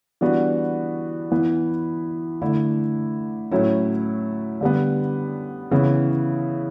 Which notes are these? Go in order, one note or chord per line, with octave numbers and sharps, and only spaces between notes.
E3 G3 B3 D4 F#4
E3 B3 E4
D3 A3 E4
A2 F#3 A3 C#4 E4
D3 G3 B3
C#3 E3 B3 E4